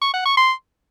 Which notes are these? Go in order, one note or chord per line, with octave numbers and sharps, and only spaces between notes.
C#6
F#5
C#6
C6